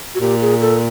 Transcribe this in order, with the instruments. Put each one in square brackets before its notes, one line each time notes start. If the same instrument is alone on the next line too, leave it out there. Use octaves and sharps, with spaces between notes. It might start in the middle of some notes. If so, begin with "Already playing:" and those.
[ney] F#4
[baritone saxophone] A#2 [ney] G4
[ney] G#4
A4